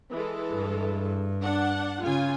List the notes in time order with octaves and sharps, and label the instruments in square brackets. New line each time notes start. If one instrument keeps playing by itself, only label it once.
[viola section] E3 G#3 A4
[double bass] G2
[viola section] D4 F#5
[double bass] C#3 [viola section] F4 G#5